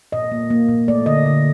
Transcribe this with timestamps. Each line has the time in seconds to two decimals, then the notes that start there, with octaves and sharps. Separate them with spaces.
0.12 A#2 D#5
0.32 A#3
0.50 A#3
0.69 A#2
0.88 A3 D5
1.06 D3 D#5
1.26 D3